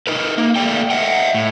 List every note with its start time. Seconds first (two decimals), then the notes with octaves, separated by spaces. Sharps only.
0.07 D#4 A#4 B4
0.38 A#3
0.56 A3 A#3 D5 G5
0.90 D#5 E5 F#5 G5
1.34 A2